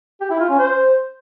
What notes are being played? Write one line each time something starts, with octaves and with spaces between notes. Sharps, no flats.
G4
E4
F4
C#4
C5